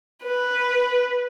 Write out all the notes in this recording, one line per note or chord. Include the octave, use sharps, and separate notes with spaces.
B4